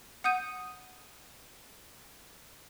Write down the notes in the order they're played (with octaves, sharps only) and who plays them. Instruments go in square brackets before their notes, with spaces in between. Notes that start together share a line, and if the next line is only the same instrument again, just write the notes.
[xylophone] F#5 D#6 G6 D#7